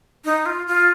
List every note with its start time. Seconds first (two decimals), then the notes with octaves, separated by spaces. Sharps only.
0.25 D#4
0.46 F4
0.67 F4